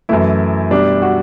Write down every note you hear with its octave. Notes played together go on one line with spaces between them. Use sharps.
F#2 E3 A3 E4
B2 G3 D4
F#4